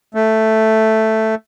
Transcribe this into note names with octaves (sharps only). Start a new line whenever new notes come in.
A3